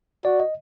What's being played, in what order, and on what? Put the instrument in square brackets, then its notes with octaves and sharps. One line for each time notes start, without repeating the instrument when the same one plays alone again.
[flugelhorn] F#4 [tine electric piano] D5
[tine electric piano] D#5